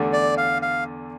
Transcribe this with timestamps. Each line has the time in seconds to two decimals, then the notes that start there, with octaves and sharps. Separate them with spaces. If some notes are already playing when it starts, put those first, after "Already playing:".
Already playing: E2 D3 A3
0.13 D5
0.37 F5
0.62 F5